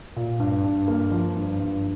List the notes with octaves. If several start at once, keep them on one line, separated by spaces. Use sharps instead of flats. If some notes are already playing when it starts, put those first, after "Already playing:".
A#2
G2
G2
A#3
F3
G2
G2